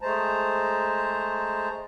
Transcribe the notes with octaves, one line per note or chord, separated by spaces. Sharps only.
G#3 A3 C5 A5 A#5